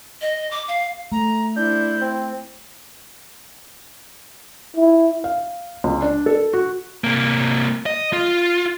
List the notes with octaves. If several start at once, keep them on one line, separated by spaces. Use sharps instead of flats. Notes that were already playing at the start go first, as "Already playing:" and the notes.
D#5
D6
F5
A3 A#5
D4 E4 C5 G6
C4
E4
F5
C#2
D4
A4
F#4
C3 A#3
D#5
F4